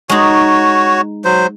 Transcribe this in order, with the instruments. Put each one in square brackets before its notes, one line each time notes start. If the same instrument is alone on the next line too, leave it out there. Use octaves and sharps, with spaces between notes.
[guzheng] G#3 D#4 [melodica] F#4 C#5
[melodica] F#3 C5